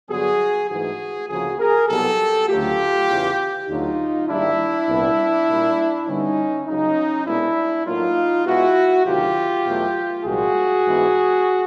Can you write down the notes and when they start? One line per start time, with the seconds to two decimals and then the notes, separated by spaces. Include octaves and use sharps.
0.10 G2 D3 F#3 B3 F#4 G#4
0.69 G#2 E3 A3 F#4 G#4
1.29 D2 C#3 F3 A#3 F#4 G#4
1.59 G#4 A#4
1.89 C2 B2 F#3 B3 G4 A4
2.48 D2 C#3 F#3 A3 F4 G4
3.08 E2 C#3 E3
3.68 D2 D3 F#3 D#4 F4
4.28 G#2 D#3 G3 A#3 D4 E4
4.87 C2 A#2 G3 B3
5.48 A#2 G3 A#3
6.07 G2 D3 G3 B3 C#4 D#4
6.67 C#2 C#3 F#3 C#4 D#4
7.27 C2 B2 G#3 B3 D4 E4
7.86 A2 F#3 A#3 D#4 F4
8.46 B2 G#3 B3 E4 F#4
9.06 D2 C3 D#3 F#3 F4 G4
9.65 E2 B2 F#3 A3
10.25 C2 A#2 F3 G#3 F#4 G#4
10.85 G#2 E3 G#3 B3